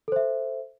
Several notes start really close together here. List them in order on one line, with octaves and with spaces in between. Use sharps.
A4 C5 E5